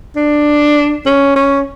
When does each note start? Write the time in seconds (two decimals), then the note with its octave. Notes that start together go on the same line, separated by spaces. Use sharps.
0.16 D4
1.06 C#4
1.36 C#4